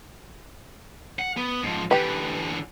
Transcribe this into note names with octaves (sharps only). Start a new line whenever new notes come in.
F#5
B3
G#2 F3
D3 E3 G4 B4